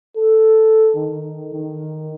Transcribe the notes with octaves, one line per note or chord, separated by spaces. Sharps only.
A4
D#3
D#3